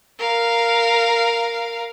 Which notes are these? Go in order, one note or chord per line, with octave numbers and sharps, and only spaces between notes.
A#4 F5